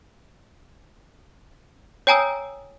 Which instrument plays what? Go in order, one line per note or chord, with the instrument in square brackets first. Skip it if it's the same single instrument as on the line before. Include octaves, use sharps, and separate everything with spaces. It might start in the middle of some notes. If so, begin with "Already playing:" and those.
[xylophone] C#5 G5 G#5 A#5 D#6 E6